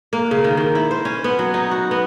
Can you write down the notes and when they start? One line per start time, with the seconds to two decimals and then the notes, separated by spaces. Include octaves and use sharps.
0.13 A#3
0.31 C#3
0.44 D#3
0.57 D#3
0.75 E4
0.91 C5
1.05 C#4
1.24 B3
1.39 F#3
1.54 D#4
1.71 F#4
1.91 B3